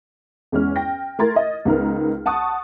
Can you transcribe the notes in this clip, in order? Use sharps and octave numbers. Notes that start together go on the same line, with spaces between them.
E2 G#3 C#4 F6
G5 A#6
A3 E4 A#4 C6 G#6 A6
D#5
C#2 B3 D#4 A#4 F6
F#5 A5 C#6 D#6 F#6